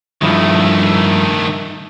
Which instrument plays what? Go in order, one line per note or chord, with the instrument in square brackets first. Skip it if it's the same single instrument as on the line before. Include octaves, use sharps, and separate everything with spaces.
[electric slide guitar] G2 F3 E4 [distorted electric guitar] D#3 A3